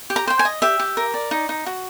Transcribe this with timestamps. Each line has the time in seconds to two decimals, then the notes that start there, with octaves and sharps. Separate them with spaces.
0.10 G4
0.16 A#5
0.27 C5 G5
0.39 G#5
0.45 D#5
0.62 G4 E5
0.80 G4
0.97 A#4
1.14 D5
1.31 D#4
1.49 D#4
1.66 F#4